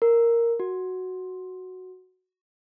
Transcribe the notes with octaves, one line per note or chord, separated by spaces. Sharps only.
A#4
F#4